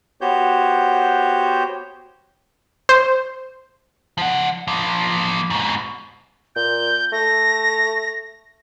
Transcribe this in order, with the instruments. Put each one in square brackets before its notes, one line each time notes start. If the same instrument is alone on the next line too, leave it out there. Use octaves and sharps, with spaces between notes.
[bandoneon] B3 F#4 G4 C5 C#5 G6
[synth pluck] C5
[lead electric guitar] F3 F#5
F3 A#3
G#2 B2
[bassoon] A#2 [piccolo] G6
[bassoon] A3 [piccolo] A#6